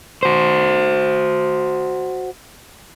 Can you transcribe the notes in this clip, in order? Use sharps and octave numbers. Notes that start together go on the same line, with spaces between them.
F#4 C5